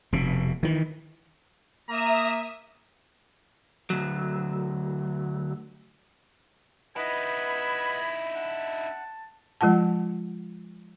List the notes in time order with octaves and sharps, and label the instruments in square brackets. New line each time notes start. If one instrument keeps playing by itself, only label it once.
[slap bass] F1 B2
D#3 E3
[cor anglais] A#3 [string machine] E5 D#6 E6 [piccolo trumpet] A#5
[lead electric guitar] D2 F#3
[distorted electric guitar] D#4 E4 [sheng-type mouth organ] B4 D#5 F#5 [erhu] B5 [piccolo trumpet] G#6
[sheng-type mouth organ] F#5 [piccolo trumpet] A5
[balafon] F3 G#3 F4 F#5 A5